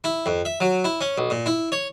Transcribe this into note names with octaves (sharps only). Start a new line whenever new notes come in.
E4
F2
E5
F#3
E4
C#4
B1
A#2
E4
C#5